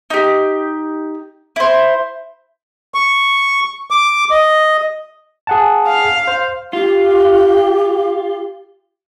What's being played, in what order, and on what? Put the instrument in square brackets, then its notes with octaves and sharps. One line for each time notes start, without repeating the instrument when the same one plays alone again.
[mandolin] D#4 G4
E4 C5
[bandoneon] C#6
D6
D#5
[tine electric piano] G#4 F#5 A5
[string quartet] F5
[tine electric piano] C5
[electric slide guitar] F4 [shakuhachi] G4